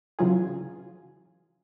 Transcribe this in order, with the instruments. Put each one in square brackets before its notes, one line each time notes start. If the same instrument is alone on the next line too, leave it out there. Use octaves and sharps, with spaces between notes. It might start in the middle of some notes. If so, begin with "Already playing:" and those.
[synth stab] C#3 E3 F#3 F4 G#4